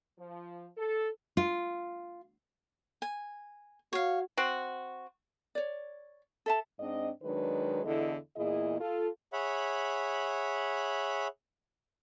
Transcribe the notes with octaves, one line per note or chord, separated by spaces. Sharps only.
F3
A4
F4
G#5
F#4 C#5 F5
C4 F#4
C#5 D5
A4 E5 A5
G#2 C4 D4 D#5
D#3 F#3 G#3 D4 B4
E2 D3 E4 A4 D#5
E2 A#2 E4 G#4 D#5
F4 A4
G#4 C#5 E5 F#5 B5